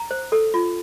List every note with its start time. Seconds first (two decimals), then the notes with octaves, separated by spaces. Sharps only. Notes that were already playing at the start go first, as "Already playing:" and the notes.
Already playing: A#5
0.11 C5
0.32 A4
0.54 F4